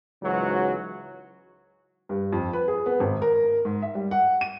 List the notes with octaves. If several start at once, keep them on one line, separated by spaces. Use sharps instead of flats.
C#2 G#2 E3 F#3 F#4
G2
F2
B4
G#4
B3
G#1
A#4
G#2
E5
G3
F#5
D#7